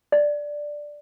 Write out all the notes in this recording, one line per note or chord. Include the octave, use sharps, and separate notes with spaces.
D5